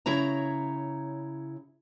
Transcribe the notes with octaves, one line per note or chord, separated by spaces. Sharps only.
C#3 E4 C#5 A#5